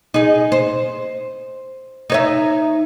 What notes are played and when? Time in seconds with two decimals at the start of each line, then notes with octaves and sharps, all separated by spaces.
0.14 D#4 G#4
0.52 C5
2.10 D#4 C#5 E5